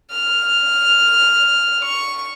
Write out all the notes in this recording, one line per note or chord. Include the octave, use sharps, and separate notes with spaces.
F6
C#6